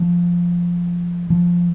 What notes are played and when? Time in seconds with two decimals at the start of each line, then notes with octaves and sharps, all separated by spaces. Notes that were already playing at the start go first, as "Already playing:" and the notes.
Already playing: F3
1.30 F3